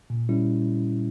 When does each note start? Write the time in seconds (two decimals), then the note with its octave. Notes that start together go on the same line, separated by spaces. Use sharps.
0.10 A#2
0.29 G3 C#4 E4